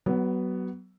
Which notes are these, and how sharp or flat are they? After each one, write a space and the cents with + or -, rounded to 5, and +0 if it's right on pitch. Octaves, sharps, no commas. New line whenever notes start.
F#3 +30 B3 +0